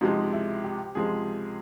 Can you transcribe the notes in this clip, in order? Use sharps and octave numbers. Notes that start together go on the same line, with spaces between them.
C#2 C3 F3 G#3 D#4
E4
G4
C#2 C3 F3 G#3 G#4